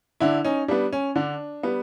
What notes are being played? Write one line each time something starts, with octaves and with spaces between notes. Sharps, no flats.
D3 D4 E4
C#4 D#4
G3 B3 D4
C#4
D3 D4
G3 B3